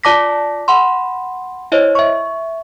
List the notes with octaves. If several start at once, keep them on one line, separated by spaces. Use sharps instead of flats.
F4 D5 A5 D6 A#6 B6
F#5 B5 C6
E4 C5 C#5 D#5
E5 C#6